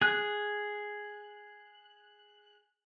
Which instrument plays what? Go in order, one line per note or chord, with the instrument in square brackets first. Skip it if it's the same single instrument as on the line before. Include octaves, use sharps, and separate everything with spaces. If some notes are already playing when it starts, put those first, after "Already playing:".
[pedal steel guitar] G#4 F#6